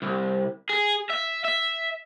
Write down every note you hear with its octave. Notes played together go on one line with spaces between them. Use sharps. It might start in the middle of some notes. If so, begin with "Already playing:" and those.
C2
G#4
E5
E5